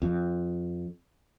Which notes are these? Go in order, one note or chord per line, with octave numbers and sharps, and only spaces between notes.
F2